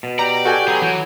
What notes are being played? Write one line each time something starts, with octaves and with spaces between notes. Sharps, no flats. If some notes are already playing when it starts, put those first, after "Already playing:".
B2
G4 D5 A#5
F#4 G4 A4 G#5 G6
F#3 B3 G#4
E3 F#3